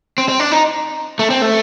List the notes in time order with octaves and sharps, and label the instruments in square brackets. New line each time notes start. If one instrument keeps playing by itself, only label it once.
[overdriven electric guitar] C4
C4
D4
D#4
A3
C4
A3